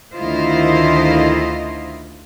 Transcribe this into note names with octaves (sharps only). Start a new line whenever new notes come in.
D2 D#3 E4 F4 C5 D#5